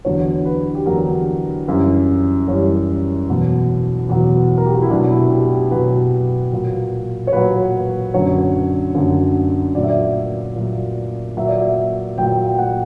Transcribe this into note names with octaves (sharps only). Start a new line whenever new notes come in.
E2 D3 F#3 C#5
B4
G4
E2 D3 F#3 A#4
F#2 E3 G3
F#2 E3 G3 C#4
E2 B2 F#3
E2 B2 F#3
A#4
G4
F#4
E4
B2 F#3 D4
E4
G4
G4
B2 F#3 B4
A#2 F#3
C#5
A#2 F#3 B4
F#2 D3 F#3 C#5
F#2 D3 F#3
A#2 F#3 D5
E5
D5
A#2 F#3
A#2 F#3 E5
D5
E5
A#2 F#3 G5
G5
F#5